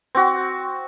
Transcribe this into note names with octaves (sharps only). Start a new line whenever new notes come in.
C4 F#4